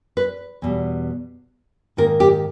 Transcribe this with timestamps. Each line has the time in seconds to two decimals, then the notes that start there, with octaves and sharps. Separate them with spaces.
0.17 B4
0.62 E2 B2 G3
1.97 G#2 D#3 A#3 A#4
2.20 G4